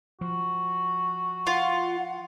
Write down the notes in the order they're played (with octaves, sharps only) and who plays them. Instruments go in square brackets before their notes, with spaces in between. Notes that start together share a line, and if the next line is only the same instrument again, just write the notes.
[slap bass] F3 [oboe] F#4
[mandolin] F4 [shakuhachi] F#5